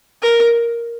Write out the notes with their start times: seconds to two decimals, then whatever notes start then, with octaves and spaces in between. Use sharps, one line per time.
0.22 A#4